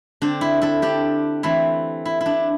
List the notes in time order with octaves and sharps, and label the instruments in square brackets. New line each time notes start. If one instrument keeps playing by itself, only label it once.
[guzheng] D3 C4 D4
E4
E4 A4
D4 G4
E3 A3 C4 E4
E4
E4
D4